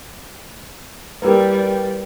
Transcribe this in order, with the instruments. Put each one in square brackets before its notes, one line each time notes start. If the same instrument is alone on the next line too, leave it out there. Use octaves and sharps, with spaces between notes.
[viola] G3 D5 [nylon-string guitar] A#3 G4 [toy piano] E4 A#4 [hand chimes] B4